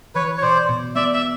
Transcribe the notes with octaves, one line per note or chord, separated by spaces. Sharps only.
E3 B4 C#5
C#5
B2 C5 D5
B2
B3 D5 E5
E5